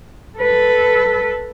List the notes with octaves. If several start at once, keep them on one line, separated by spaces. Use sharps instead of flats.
A4 B4